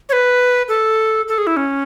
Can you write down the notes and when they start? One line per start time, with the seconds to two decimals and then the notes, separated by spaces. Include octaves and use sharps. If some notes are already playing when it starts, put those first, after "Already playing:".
0.09 C#5
0.13 B4
0.68 A4
1.28 A4
1.38 G#4
1.47 E4
1.57 C#4